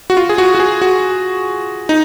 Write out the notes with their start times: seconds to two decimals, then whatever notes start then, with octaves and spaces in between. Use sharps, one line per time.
0.10 F#4
0.17 F4
0.29 G#4
0.38 F#4
0.55 F#4
0.60 G#4
0.82 F#4
1.89 D#4